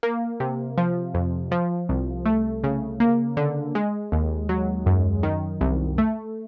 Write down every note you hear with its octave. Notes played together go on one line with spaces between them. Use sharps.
A#3
C3
F3
F2
F3
C2
A3
C#3
A#3
D3
G#3
D#2
F#3
F#2
D#3
C2
A3